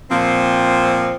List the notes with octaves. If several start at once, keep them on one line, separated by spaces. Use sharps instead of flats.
A#2 F3 C4